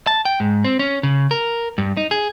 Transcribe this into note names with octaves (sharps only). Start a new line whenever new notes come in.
A5
G5
G#2
C4
C#4
C#3
A#4
G2
D#4
G#4